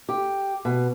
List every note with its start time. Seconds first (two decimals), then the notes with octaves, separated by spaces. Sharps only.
0.09 G4
0.65 B2